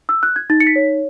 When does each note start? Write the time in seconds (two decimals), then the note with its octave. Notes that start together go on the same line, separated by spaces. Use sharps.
0.09 E6
0.23 F#6
0.36 G#6
0.50 D#4 A6
0.60 C#7
0.67 B6
0.76 C#5